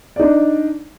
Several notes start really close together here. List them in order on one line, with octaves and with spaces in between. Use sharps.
D5 D#4 D4